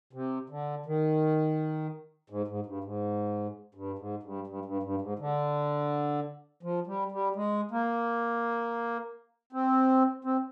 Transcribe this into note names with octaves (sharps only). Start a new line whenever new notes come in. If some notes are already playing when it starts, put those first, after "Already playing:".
C3
D3
D#3
G#2
G#2
G2
G#2
G2
G#2
G2
G2
G2
G2
G#2
D3
F3
G3
G3
G#3
A#3
C4
C4